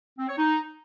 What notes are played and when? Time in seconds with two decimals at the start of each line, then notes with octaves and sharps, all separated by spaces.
0.18 C4
0.28 C#5
0.38 D#4